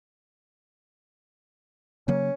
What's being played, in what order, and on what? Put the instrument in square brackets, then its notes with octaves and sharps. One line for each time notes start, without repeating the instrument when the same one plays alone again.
[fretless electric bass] C#3 F#3 A#3 [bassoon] C#4